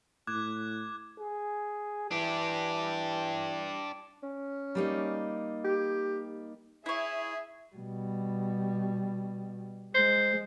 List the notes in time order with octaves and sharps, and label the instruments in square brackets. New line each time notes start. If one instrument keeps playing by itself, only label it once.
[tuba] A2 [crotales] D6 F#6 G#6
[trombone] G#4
[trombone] E3 [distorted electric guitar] D4 G4
[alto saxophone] C#4
[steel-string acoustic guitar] G3 A#3 D#4
[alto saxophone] G4
[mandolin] E4 C#5 [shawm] G#4 [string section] E5
[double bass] B2 G3
[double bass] G#3 [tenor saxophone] C5